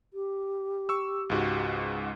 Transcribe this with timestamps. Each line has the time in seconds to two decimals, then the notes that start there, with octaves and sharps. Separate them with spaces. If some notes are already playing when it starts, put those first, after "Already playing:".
0.13 G4
0.89 C#6 E6
1.30 C#2 G#2 F#4